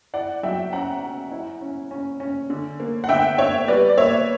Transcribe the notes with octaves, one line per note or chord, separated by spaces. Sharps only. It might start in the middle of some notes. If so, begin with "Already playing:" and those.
E4 D5 F#5
F#3 E5 G5
C#4 F#5 A#5
C#4
E4
C#4
C#4
C#4
D3
A#3
F#5
D3 E5 G5
D4 C#5 E5
G3 B4 D5
D5
A#3 C#5 E5